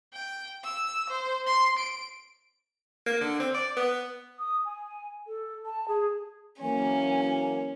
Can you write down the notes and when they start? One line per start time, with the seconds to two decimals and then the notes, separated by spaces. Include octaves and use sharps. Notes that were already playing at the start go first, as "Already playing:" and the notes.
0.13 G5
0.64 E6
1.09 C5
1.46 C6
1.78 D7
3.06 A#3
3.21 D3
3.39 C4
3.54 D5
3.76 B3
4.39 D#6
4.65 G#5
5.27 A4
5.65 A5
5.88 G#4
6.62 E3 F#3 A#3 C#4 G#5